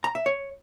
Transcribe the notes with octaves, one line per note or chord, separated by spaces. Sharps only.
A#5
E5
C#5